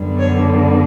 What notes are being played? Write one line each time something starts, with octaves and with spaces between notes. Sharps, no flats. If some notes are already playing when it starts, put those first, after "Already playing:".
Already playing: F#2 D3 G3 B3
C#5